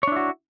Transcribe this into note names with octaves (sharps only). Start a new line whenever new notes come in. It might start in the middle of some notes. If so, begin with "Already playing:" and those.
D4 E4 F#4 C#5